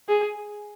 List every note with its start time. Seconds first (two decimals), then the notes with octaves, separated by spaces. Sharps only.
0.09 G#4